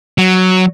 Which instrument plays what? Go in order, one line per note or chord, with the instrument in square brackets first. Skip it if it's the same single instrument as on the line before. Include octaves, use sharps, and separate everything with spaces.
[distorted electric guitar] F#3